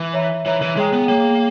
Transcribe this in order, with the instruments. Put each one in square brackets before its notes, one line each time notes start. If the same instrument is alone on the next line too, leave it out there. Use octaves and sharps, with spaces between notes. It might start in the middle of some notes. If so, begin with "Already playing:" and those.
Already playing: [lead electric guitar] E3
[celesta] C#5 E5 A#5
[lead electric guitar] E3 [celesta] C#5 E5 A#5
[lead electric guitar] E3
[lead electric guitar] G#3 [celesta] G#4 C#5 G5 A#5
[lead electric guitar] B3
[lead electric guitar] A#3 [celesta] G#4 C#5 G5 A#5